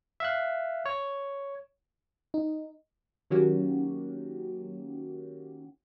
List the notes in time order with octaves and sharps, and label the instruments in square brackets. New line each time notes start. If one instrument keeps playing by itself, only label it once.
[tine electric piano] E5 F5 F#6
C#5
[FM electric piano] D#4
[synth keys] D#3 F#3 A#3 C#4 F#4 G4